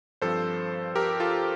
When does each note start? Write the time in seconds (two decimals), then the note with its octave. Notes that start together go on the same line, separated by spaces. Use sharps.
0.22 G2 F3 C4 A4 C5
0.95 G4 A#4
1.20 F4 A4